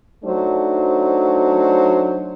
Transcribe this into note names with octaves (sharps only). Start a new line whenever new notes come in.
F#3 A3 D4 D#4 C5